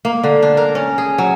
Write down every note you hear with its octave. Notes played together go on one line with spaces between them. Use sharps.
A#3
D3
D4
A#4
C#4
G#4
F#3